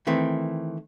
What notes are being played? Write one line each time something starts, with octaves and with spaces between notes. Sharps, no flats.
D#3 E3 A3 C4